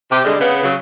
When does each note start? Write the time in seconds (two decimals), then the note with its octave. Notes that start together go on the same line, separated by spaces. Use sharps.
0.10 C3 G4
0.25 D3 G3 G#3
0.39 C#3 B3
0.63 C#3 F#3